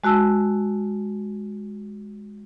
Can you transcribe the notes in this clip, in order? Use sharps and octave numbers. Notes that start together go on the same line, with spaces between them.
G#3 F#4 A5 E6